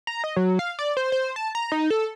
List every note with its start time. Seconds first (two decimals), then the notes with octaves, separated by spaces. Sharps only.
0.07 A#5
0.24 D#5
0.37 F#3
0.59 F5
0.79 D5
0.97 C5
1.12 C5
1.36 A5
1.55 A#5
1.72 D#4
1.90 A4